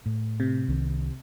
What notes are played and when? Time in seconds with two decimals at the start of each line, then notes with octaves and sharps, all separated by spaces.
0.06 A2
0.40 C3
0.68 C2 D#3